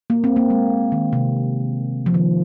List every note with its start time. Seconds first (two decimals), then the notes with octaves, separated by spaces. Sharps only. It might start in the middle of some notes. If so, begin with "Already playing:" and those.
0.10 A#3
0.24 C4
0.36 A#3
0.50 G#3
0.92 D#3
1.13 C3
2.06 F3
2.14 D#3